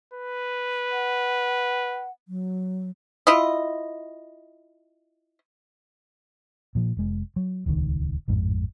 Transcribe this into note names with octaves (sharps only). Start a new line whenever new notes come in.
B4
F#5
F#3
E4 F4 D#5
A#2 F3
F1 G#3
F#3
D#1 C#2 D#3
A1 F2 G#2